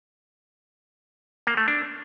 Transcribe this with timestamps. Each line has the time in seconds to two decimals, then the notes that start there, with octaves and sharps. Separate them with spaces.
1.47 A#3
1.57 A3
1.68 D4